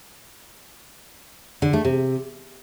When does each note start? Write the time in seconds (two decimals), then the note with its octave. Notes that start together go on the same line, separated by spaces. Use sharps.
1.62 D3
1.73 A3
1.85 C3